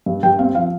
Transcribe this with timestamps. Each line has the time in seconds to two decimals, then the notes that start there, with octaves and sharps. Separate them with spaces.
0.06 G2
0.23 G2 G5
0.39 C4 F5
0.55 F3 F5